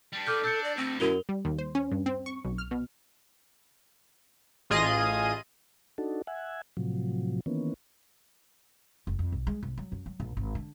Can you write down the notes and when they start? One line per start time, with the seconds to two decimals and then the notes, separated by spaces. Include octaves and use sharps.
0.13 G3 D4
0.27 A4 D6 F6 G6
0.44 D4 E6 G6 C#7
0.64 D5
0.77 D2 C4
1.00 F#2 E4 A#4 F7 G7
1.29 G3
1.45 D#2
1.59 C5
1.75 C#4
1.91 G2
2.06 C4
2.26 C#6
2.45 B1
2.58 F6
2.71 B2
4.70 A1 F4 G#4 D#5 D#7
5.98 D4 D#4 F#4 A4
6.27 E5 F#5 G#5
6.77 A2 C3 F3 F#3
7.46 D#3 E3 A#3 B3 C#4
9.07 F1
9.19 F2
9.32 B1
9.47 G#3
9.63 B1
9.77 F#3
9.92 F#2
10.06 F#3
10.20 A#1
10.37 G#1
10.55 D3